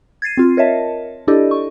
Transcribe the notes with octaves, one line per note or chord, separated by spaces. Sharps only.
G#6 A6 C7 D#7
C4 F4
A#4 C#5 D#5 E5 A5
D4 E4 G4 A4 D5 D#5
C#6